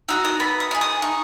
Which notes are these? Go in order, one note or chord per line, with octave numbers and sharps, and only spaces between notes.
D#4 F#4 E6
D#6
B3 B5
D#6
D#4 G#4
D#6
D#4 C#6